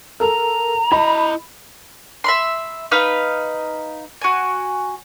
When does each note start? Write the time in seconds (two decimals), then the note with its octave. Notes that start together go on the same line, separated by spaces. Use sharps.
0.20 A4 A#4 A#5
0.92 E4 D#5 B5
2.24 E5 B5 C6
2.91 D#4 B4 F5
4.21 F#4 G#5